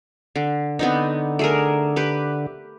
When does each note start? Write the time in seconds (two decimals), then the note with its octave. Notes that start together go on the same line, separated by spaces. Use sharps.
0.35 D3
0.79 D3 B3 C4 D#4
1.39 A3 G#4 A#4
1.96 G4 B4